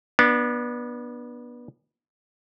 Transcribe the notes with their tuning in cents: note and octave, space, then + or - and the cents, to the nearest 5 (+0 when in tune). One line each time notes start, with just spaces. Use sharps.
B3 -25 D4 +15